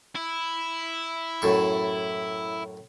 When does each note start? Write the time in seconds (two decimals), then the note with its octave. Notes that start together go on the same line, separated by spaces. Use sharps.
0.15 E4
1.42 F#2 A2 C#6